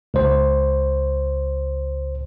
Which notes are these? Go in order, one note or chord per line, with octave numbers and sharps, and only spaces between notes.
C#2 C5